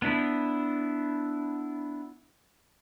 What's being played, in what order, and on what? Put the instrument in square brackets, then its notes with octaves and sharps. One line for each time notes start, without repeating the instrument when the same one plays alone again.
[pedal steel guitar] B3 D4 E4